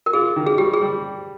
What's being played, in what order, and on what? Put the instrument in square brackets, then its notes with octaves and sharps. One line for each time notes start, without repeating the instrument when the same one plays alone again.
[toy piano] A#4
[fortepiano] F4 [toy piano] G#4
[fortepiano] D#3
[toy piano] G#4
[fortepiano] G3 [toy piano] G4
[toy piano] G#4
[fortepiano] G3